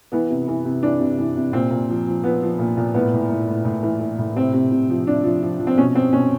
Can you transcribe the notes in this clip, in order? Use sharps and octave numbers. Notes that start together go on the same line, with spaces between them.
E3 B3
C3
E3
C3
E3 D4
C3
E3
C3
A#2 C4
A#2
F3
F3
F3 B3
F3
A#2
A#2
A2 B3
A2
A2
A2
A2
E3
E3
A2
C3 C4
C3
C3
F3
C3 D4
F3
F3
F3
C4
B2 C#4
B2 C4
B2 C#4